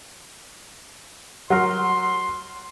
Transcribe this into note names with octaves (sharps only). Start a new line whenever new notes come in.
F#3 A#4 C6